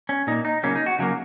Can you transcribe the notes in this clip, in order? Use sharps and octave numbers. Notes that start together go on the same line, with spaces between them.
C#4
A#2 A#3 D#4
D#4
C#3 F#3 A#3 C#4
D#4
F#4
C#3 F#3 A#3